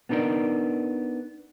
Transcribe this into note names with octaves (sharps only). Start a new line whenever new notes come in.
B3 D4 D#4 A#4 D5